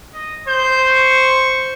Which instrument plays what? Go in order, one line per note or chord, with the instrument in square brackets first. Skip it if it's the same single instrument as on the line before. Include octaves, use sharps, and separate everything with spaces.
[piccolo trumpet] D#5
[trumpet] C5 [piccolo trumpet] G6
[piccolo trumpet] C#6